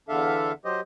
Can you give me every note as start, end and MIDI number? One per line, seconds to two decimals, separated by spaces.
0.09 0.52 40
0.09 0.52 50
0.09 0.52 62
0.09 0.52 69
0.09 0.52 76
0.09 0.52 77
0.65 0.81 54
0.65 0.81 67
0.65 0.81 72
0.65 0.81 75